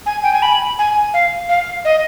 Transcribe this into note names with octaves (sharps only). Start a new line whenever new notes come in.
G#5
G5
G#5
B5
G#5
F5
F5
D#5